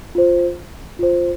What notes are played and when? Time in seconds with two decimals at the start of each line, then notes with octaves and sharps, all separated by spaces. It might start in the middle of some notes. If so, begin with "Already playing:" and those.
0.15 F4 C5
0.99 F4 C5